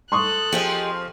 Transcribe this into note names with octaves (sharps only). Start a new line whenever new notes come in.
A4 C6 C#6 D#6 F#6
F3 C4 G4 G#4 D#5